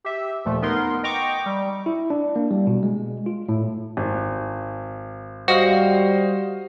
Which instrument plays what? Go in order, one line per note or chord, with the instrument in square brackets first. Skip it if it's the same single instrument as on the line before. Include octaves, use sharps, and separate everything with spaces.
[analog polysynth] G4 E5
D#2 A#2 F3 A3
B3 D#4 A#4 C6
D#5 G5 A#5 C#6 D6
G3
[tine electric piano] E4
D4
A#3
G3
B2
G#3
F4
A2
[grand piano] G#1
[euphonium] G3 [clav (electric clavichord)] F#4 [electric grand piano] C5 D#5 F5